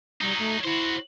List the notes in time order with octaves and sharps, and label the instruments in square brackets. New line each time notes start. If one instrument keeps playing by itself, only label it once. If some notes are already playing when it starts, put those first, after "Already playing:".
[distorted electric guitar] F#3 D#4 [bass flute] G3
[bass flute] A3
[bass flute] E4 [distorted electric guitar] F#4 C5